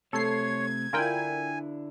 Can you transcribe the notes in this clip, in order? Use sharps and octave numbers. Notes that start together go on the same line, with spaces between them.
C3 A3 A4 C#5 G#6 C7
D3 D4 E4 F4 A#4 G5 G#5